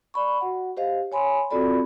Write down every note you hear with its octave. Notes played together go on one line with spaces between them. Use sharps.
D5 B5 C#6
F#4 F#5
G4 C5 D#5 F5
C#5 G#5 B5 C6
C4 F4 F#4 A4 D5 B5